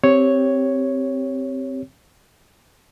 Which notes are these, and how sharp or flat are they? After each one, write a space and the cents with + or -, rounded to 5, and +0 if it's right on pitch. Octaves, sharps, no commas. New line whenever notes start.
C4 +0 G4 +0 C#5 +0